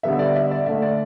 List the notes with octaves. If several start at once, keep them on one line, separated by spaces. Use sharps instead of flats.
D3 G3 B3 E5
D5
E5
D5
D3 A3 E5
D5